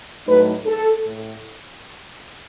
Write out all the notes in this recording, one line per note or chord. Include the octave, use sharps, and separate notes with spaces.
A2 F#3 A3 D#4 B4
A4
A2